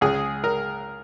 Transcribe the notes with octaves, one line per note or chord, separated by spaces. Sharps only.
C#2 G#4
A#4